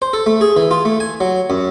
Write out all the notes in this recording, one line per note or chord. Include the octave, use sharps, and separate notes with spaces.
C5
A4
A3
G#4
E3
F4
A3
G#5
F#3
F#2